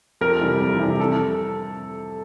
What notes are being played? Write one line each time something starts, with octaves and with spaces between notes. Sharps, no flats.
F2 A#4
C3 E3 G3
F2
C3 E3 G3
A4